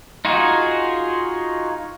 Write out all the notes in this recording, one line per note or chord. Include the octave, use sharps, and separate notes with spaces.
D#4 F4 F#4 G#4